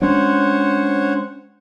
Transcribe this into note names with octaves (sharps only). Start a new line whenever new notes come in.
G#3 C#4 D4 C5 C#5 F#5